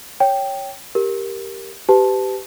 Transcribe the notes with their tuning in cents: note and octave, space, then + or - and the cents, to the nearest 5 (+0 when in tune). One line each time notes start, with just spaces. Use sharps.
C#5 +0 G5 +0
G4 +0 A#4 +0
G4 -15 B4 +30 A5 -10